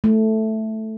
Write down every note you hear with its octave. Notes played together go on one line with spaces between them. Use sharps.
A3